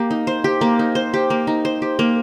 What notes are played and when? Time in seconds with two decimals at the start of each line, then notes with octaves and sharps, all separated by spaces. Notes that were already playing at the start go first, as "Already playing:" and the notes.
Already playing: A#3 G4
0.11 D#4
0.27 C5
0.44 G4
0.61 A#3
0.79 D#4
0.95 C5
1.14 G4
1.30 A#3
1.47 D#4
1.65 C5
1.82 G4
1.99 A#3